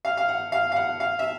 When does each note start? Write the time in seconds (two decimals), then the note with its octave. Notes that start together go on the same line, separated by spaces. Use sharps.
0.05 F5
0.17 F5
0.29 F#5
0.52 F5
0.72 F5
0.76 F#5
1.00 F5
1.19 E5